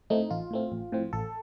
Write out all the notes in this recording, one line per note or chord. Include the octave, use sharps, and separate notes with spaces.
A2 A3 C4 D#4
A1 F4
A2 A3 C4
A1
A2 F3 C4
A1 A4